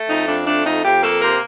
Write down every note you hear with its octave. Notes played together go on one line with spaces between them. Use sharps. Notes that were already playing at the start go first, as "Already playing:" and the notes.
Already playing: A3
F2 D#4
F2 D4
A3 D4
F2 D#4
F2 G4
A#3 A4
C3 A#4